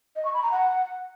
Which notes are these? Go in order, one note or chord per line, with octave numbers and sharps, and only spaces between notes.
D#5
C#6
B5
A#5
F#5